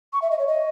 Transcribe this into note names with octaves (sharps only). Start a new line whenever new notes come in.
C#6
E5
D#5
C#5
D#5